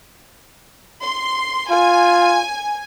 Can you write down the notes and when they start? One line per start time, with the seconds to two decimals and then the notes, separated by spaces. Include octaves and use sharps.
1.03 C6
1.71 F4 G#5